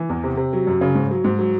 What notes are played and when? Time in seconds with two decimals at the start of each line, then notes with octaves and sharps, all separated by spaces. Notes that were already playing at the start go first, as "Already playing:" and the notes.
Already playing: E3
0.10 E2
0.24 C3
0.37 C3
0.53 F#3
0.67 F#2
0.81 C#3
0.95 G#2
1.11 F#3
1.24 G#2
1.39 F#3